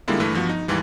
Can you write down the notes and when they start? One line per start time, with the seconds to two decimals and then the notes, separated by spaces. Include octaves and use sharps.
0.08 D3 G3 G#3 A#3 E4 F4
0.20 G2 E3 A3
0.34 G2 F3 B3 F#4
0.49 D#4
0.68 D#2 G#2 E3 G3